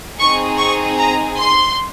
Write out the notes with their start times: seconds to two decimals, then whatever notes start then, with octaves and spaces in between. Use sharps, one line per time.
0.19 C4 D#4 G#4 C#6
0.58 C#6
0.98 A#5
1.37 C6